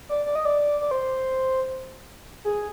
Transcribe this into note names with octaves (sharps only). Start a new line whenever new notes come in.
D5
D5
D#5
D5
D5
C5
G#4